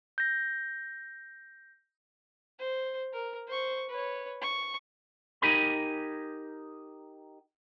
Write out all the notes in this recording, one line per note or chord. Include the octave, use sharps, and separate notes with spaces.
G6 A#6
C5
A#4
C5 C#6
B4 C#5
C#6
D#4 G4 A#4 G#5 B5